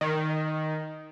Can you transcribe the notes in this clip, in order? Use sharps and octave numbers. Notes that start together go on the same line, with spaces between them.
D#3